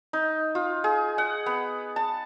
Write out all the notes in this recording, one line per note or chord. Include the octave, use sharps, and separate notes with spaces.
D#4
F4
G#4
F#5
B3
A5